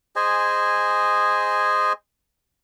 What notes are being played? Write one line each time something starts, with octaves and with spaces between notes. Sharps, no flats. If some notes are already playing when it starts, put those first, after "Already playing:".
G#4 C5 D#5 G#5